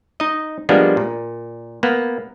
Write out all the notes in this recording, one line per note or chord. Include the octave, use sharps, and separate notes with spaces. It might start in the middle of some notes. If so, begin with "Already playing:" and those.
D#4 D#5
F3 G3 G#3 A#3 B3 D4
A#2
A#3 B3